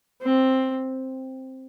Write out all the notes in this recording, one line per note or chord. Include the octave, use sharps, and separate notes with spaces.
C4